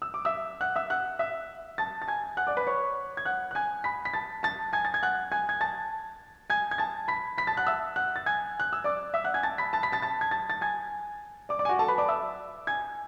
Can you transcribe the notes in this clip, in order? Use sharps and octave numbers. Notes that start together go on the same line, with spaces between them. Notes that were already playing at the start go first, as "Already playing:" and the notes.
E6
D6
E5 E6
F#5 F#6
E5 E6
F#5 F#6
E5 E6
A5 A6
A6
G#5 G#6
F#5 F#6
D5 D6
B4 B5
C#5 C#6
G#6
F#5 F#6
F#6
G#5 G#6
B5 B6
B6
A5 A6
A5 A6
G#5 G#6
A6
G#6
F#5 F#6
G#5 G#6
G#6
A5 A6
G#5 G#6
G#6
A5 A6
B5 B6
B5 B6
A5 A6
F#5 F#6
E5 E6
F#5 F#6
A6
G#5 G#6
F#6
E6
D5 D6
E5 E6
F#5 F#6
G#5 G#6
A5 A6
B5 B6
A5 A6
B5 B6
A5 A6
A5 A6
G#6
A5 A6
A6
G#5 G#6
D5 D6
D5 D6
G#5
F#4 F#5
A4 A5
B4 B5
D5 D6
E5 E6
G#5 G#6